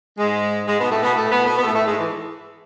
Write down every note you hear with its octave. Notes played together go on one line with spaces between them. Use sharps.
G#2 G#3
G#2 G#3
B2 B3
A2 A3
B2 B3
A2 A3
B2 B3
B2 B3
B3
A2 A3
A2 A3
G#2 G#3
E3